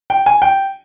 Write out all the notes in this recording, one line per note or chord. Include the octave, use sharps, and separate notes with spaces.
G5
G#5
G5